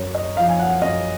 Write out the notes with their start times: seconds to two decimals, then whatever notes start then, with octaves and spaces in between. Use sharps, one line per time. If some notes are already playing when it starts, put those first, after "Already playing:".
Already playing: F#2 C#5
0.15 D#5
0.37 F3 F5
0.49 G#5
0.60 F#5
0.82 F#2 D#5